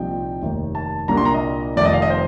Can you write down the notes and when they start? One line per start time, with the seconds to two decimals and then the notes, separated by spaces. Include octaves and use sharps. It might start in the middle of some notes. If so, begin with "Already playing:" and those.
Already playing: C2 A#2 F3 C4 D#4 G5
0.42 F1 D#2 D#3
0.75 A5
1.08 C2 A#2 G3 A#3 D4 A#5
1.17 C6
1.25 A#5
1.34 D#5
1.76 F1 F2 D#3 D5
1.85 D#5
1.93 F5
2.02 D#5
2.10 C5